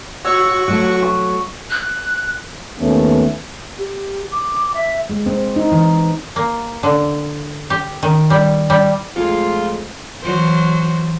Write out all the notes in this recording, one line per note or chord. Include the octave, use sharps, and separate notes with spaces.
F#4 C#5 C#6 E6
F#3 A3
C#6
F#6
D#2 A3 B3 C#4
G4
D6
E5
G#3
C4
D#4
E3
A#3
D3
G4
D#3
G3
G3
F2 G#3 A3 F4 G#4
E3 F#3 C5